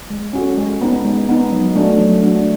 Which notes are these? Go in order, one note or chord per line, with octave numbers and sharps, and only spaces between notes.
G#3
C#4 F#4 A4
G#3
B3 D#4
G#3
B3 D#4
F#3
A3 D4 F#4
F#3
A3 D4 F#4